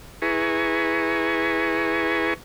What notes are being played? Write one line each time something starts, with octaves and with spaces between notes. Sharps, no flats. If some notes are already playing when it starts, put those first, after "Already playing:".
E4 G#4 B4 G#5 A#5 C#6